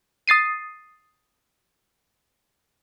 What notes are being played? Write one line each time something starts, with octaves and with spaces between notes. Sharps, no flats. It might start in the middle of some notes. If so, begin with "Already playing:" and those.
D#6 A6 C7 D#7